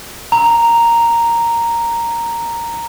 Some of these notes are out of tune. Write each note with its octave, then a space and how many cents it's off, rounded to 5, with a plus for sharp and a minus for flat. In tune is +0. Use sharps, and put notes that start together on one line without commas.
A#5 -5